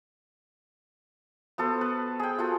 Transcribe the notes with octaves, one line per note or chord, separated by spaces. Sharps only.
B3 F#4 A4 C5
B4
G#4 G5
F4 F#4 A4